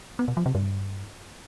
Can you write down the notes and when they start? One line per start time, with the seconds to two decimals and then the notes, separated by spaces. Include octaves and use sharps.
0.19 B3
0.28 B2
0.37 F3
0.46 C3
0.55 G2